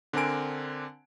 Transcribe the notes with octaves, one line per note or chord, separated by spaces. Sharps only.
D3 C4 D4 A#4 G#5 D7